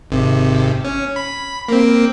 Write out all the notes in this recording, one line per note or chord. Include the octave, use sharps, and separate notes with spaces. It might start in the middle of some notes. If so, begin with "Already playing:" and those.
G#1 C3
C#4
B5
A#3 C4